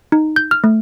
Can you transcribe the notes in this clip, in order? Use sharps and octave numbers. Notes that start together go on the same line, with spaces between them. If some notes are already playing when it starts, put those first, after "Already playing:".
D#4
G6
F6
A3